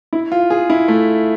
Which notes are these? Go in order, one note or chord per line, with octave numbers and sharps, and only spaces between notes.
E4
F4
G#4
E4
A3